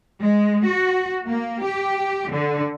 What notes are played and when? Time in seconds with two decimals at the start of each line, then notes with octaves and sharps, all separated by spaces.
0.22 G#3
0.67 F#4
1.28 A#3
1.65 G4
2.31 D3